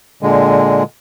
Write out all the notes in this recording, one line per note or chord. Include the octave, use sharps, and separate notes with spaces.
A#2 D3 G#3